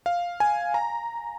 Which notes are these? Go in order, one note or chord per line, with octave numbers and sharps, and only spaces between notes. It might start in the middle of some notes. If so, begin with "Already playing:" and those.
F5
G#5
A#5